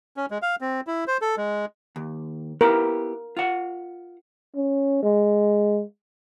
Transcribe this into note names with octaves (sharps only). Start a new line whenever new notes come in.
C#4
G#3
F5
C4
E4
C5
A4
G#3
D#2
B3 E4 G4 A#4
F4 F#5
C#4
G#3